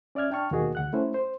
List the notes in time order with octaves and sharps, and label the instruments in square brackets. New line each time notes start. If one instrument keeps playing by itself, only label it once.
[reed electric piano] C#4 D5 E5 F6 G#6
D4 G5 A5 C#6 F6
D#2 B2 A#3 F#4 G#4 D#5
D2 F#5 F#6
A3 C#4 E4 C5
C5